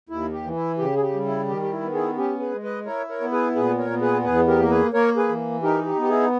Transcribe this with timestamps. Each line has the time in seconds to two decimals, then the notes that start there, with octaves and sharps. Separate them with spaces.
0.09 D#2 E4
0.32 G4
0.44 E3
0.56 E4
0.78 C#3 G4
0.96 G#4
1.02 G4
1.13 G3
1.25 E4
1.48 D#3 G4
1.62 G4
1.71 E4
1.82 B3
1.94 E4 G#4
2.17 C#4 G4
2.40 G#4 B4
2.52 G#3
2.63 B4 D#5
2.86 E4 A#4 C#5
3.09 A#4 C#5
3.21 B3
3.32 G#4 B4
3.55 A#2 G#4 B4
3.79 A#4 C#5
3.90 B3
4.01 G#4 B4
4.24 E2 G#4 B4
4.48 G4 A#4
4.59 A#3 A#4
4.70 G#4 B4
4.93 A#3 A#4 C#5
5.17 G#4 B4
5.28 E3
5.63 D#4 G4 A#4
5.86 G4
5.97 B3 G4
6.09 E4 G#4